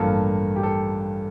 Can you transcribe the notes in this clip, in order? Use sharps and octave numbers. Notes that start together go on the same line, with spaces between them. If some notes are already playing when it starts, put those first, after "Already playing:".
Already playing: A1 G2 F3 A#3 A4
G4
A4